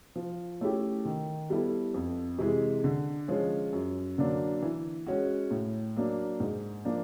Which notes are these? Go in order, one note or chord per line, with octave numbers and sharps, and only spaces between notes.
F3
A3 C#4 E4 G4
D#3
G3 B3 E4 A4
F2
C3 E3 G#3
D3
F3 G#3 C#4 F4
F#2
D3 F#3 A#3 D4
E3
G#3 C#4 F#4
A2
F#3 A#3 D4
G#2
F3 A#3 D4